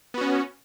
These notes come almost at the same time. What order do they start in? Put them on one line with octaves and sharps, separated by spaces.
B3 F#4 C#4